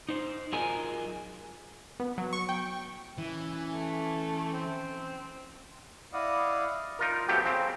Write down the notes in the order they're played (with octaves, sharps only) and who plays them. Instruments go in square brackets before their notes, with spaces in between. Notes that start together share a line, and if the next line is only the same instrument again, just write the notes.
[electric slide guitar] D#4 C5
F#3 F4 G#4 A#4 D#5 G#5
[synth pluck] B3
F#3
C#6
G5
[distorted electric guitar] E3 [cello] C#4
[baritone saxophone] A3
C4
[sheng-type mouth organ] E4 D5 D#5 F5 F#5 D#6
[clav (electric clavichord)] D#4 F4 A#4
F3 F#3 A3 B3 C4 G4
C#3 C4